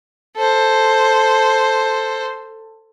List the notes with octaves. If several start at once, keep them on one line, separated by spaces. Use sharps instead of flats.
A4 C5